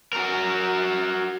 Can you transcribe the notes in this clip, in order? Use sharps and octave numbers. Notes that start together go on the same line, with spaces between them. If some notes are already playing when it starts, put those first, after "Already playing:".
F#4 A#4